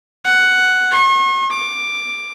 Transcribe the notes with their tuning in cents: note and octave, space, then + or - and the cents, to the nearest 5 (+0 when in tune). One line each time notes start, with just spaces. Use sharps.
F#5 +5
C#6 -45
D6 +5